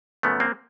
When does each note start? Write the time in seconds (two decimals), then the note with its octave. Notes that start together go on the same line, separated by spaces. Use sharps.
0.23 F#2 C#3 F3 A3 B3
0.40 A#3 C4